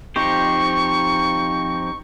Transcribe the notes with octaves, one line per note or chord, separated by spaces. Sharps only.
F3 C4 D#4 G4 C5 C#6